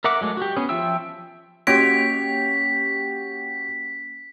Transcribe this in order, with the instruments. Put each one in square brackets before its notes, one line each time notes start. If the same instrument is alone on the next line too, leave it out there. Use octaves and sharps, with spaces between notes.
[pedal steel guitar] A#4 E5 F#5 D6
F#3 G#3 A3
F#4 G4
B3 C#4 G#4
F3 F4 E5 G5 E6
[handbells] A#3 C#4 D7 [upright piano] F#4 G4 C#5 [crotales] B6